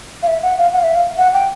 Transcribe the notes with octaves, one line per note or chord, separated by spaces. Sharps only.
F5
E5
F#5
F5
F#5
F5
E5
F5
F#5
G5